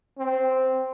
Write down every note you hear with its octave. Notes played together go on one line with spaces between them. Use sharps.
C4